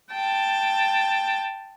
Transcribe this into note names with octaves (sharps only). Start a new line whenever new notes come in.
G5 A5